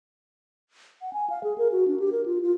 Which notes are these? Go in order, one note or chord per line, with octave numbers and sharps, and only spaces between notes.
F#5
G#5
F5
G#4
A#4
F#4
D4
G4
A#4
F4
F4